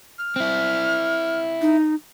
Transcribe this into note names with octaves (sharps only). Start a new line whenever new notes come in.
F6
C4 E4
D#4